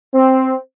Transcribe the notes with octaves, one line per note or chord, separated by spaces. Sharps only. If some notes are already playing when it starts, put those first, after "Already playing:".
C4